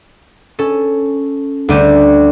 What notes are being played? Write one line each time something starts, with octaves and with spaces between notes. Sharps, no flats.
C#4 A4
D2 G3 G4 D#7